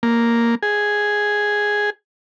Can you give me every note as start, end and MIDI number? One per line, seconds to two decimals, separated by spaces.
0.03 0.55 58
0.63 1.90 68